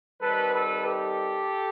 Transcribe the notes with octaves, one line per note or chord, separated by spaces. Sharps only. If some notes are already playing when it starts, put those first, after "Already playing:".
D#3 G3 C4 A4 B4
A4 B4
G4 A4